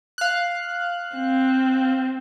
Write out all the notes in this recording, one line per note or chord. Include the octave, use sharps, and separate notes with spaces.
F5 F#6
C4